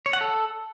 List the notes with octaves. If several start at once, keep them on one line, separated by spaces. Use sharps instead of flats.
C#5
F#5
A4